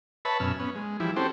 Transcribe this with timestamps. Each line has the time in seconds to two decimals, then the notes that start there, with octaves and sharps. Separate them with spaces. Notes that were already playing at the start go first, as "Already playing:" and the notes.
0.25 B4 C#5 E5 A5 B5
0.40 F#2 B2 C#4 E5 F6
0.60 B3 C#4
0.75 G#3
1.00 E3 F3 G3 E4
1.16 C4 C#4 F#4 G4 A4 C5